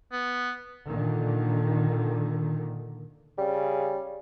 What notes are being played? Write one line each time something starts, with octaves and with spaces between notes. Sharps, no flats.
B3
A#2 D3 D#3
C#3 G3